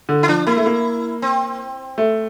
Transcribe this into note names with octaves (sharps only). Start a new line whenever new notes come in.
D3
E4
F3 D4
A#3 E4
A3
A#3
C4
A3